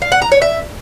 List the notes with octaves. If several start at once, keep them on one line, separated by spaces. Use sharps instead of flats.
F5
F#5
A#5
C#5
E5